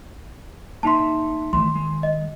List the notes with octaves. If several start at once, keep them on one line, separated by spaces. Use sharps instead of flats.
A#3 D#4 E5 A5 C6
D#3 E3 A3 C6
G#3
D#5